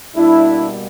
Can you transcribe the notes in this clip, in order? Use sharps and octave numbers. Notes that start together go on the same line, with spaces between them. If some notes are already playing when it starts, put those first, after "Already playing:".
B2 G3 A#3 D4 E4